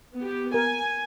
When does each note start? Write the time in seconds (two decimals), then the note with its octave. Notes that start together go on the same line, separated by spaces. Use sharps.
0.19 B3 G4
0.54 A#4 G#5